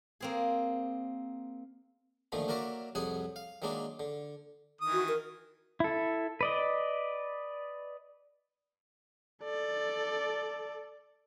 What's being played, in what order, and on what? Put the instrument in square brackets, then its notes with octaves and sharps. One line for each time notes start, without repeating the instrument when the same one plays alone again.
[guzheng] A#3 C4 G#4
[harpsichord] A#2 D3 D#3 F3 A3
F#3 A#3 F#4 A#4 D5 E5
C2 F2 F#3 G#4 F#5 G#5
F5
D#3 F#3 G#3 A#3 D4
D3
[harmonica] D#3 E3 D#6
[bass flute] F#4
A#4
[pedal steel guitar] E4 A4
B4 D5 D#5
[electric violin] A4 D5